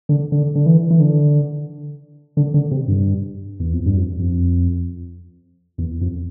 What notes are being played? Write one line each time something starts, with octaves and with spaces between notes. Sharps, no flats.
D3
D3
D3
E3
E3
D3
D3
D3
C3
G2
E2
F2
G2
F2
F2
E2
F2